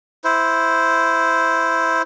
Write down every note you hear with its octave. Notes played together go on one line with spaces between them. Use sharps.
E4 C5